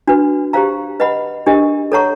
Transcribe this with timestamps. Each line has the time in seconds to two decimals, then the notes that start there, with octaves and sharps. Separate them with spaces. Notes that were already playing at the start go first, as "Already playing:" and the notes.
0.07 D4 F#4 B4
0.53 G4 C5 F5 A#5
1.00 B4 D#5 F#5 B5
1.46 D4 G4 A#4 D#5
1.92 A4 C#5 F#5 A#5 C#6